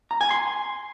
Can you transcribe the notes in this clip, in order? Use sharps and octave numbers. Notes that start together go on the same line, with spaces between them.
A#5
G#5
C6